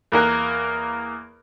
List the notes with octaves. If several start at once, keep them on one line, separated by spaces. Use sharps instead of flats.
E2 A#3 A#4 F#6